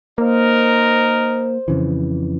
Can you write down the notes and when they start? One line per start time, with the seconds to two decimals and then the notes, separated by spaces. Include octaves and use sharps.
0.18 A#3 D#4 A#4 C5
1.68 F2 C#3 E3